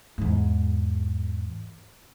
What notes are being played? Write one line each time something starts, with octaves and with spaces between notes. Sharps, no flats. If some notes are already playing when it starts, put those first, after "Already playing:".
E2 G#2